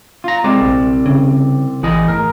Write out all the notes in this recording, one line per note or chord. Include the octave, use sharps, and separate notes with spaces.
F4 A#5
C2 G#3 C4 D5
A#1
C#3
A1 E3 G#4 D#5
A2 A#4